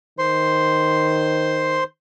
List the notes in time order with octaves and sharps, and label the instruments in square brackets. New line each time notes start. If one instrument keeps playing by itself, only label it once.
[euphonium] D#3 [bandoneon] C5 C6